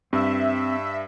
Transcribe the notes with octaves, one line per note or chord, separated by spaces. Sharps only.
G2 C4 E5